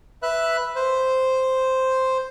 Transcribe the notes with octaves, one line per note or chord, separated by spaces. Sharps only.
B4 E5 F#6
C5